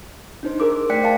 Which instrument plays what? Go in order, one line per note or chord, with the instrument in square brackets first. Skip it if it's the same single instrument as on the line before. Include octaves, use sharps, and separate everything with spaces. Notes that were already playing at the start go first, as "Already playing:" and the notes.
[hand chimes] D4 D#4 C5
G#4 A#4 C5 D6
D6
A3 D5 G5 F#6 B6 C#7
D5 F5 G5 A5